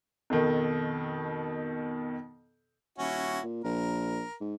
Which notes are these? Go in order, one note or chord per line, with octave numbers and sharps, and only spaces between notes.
F2 B2 D#3
D#1 C#4 E4 F#4
A#2
A#1 A#4
G#2